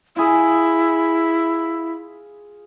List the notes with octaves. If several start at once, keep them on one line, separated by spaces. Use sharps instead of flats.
E4 F4 G#4